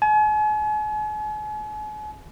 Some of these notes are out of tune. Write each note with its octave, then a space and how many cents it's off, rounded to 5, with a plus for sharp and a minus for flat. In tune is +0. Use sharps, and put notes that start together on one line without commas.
G#5 +40